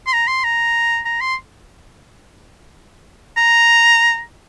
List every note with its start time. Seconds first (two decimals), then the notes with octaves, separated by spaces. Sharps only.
0.07 C6
0.13 A#5
0.27 C6
0.44 A#5
1.05 A#5
1.21 C6
3.37 A#5